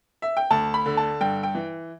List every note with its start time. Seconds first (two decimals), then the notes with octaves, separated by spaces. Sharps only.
0.22 E5
0.37 G5
0.51 D2 A5
0.74 B5
0.86 D3
0.97 A5
1.21 G2 G5
1.43 G5
1.55 E3